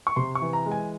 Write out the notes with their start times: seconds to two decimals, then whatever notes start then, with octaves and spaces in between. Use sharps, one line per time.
0.07 C#6
0.16 C3 C6
0.35 C#6
0.42 E3
0.53 A#5
0.66 G#3
0.72 G#5